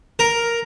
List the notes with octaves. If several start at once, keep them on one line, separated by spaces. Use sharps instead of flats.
A#4